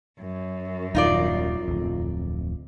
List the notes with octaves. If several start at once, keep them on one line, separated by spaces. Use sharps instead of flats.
F#2
D#1 D#2 D#4 F4 D5
D1 F2